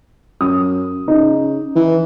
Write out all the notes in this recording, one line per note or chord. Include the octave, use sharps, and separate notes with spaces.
F#2 D#6
C#3 D#4
E3